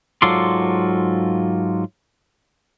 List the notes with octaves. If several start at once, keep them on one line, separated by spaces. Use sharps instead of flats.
G#2 F#3 F4 A4 D5 C6